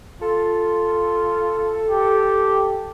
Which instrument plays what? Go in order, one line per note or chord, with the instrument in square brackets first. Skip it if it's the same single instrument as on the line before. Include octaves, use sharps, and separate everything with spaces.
[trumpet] F4 [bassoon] A4
[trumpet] G4